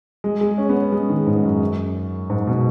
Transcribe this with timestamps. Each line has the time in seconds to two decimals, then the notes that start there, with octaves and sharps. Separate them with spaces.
0.24 G#3
0.41 G#3
0.58 C#4
0.69 B3
0.75 C#4
0.92 G#3
1.09 D#3
1.27 G#2
1.43 F#2
2.30 G#2
2.47 B2